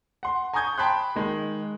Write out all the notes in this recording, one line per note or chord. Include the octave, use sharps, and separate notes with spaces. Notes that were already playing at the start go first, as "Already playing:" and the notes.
F#5 C6
G#5 A#5 C#6 D#6 G6 G#6
G5 A5 B5 C6 F#6
D#3 G#3